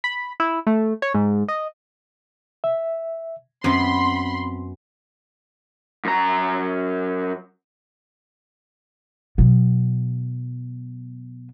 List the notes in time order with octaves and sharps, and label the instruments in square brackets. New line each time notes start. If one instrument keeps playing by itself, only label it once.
[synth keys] B5
E4
A3
C#5
G#2
D#5
[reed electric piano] E5
[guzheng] F#2 B3 [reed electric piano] C4 [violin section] B5 C6
[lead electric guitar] F#2 A#5
[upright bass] B2 F#3